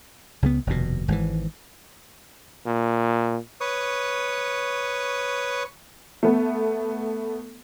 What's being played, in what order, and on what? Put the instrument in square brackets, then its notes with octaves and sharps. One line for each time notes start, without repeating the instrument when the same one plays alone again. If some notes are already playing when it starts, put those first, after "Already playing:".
[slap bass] C#2 C#3 G#3 B3
F1 D#2 B2
G#1 G#2 D3 E3
[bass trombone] A#2
[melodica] B4 C#5 C#6 D#6
[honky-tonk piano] A3 B3